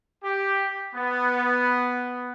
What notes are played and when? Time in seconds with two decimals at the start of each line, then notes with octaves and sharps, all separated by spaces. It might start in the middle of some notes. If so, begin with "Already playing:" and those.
0.23 G4
0.95 B3